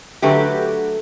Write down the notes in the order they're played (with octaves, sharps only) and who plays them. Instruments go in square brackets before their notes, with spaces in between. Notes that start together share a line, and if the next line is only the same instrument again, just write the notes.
[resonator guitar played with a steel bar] D3 F#3 A3 G4 B4